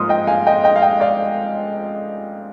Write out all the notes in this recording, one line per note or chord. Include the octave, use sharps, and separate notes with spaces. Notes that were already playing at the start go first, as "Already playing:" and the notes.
Already playing: G#2 F3 A#3 C6 D#6 F6
D#5 G5
F5 G#5
D#5 G5
D#5 G5
F5
D#5 G5
D5 F5